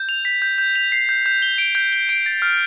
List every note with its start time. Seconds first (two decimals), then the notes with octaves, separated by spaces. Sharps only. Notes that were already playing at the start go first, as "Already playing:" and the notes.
Already playing: G6
0.09 F7
0.25 B6
0.42 G6
0.58 G6
0.75 F7
0.92 C7
1.09 G6
1.26 G6
1.42 G7
1.58 D7
1.75 G6
1.93 G7
2.09 D7
2.26 A6
2.42 F6